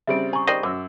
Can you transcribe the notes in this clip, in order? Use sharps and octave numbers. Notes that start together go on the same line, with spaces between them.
C#3 G3 C4 E5 D7
G#4 A#5 C#6
D#3 G4 C5 D5 D#5
F#2 F#3 D6 E6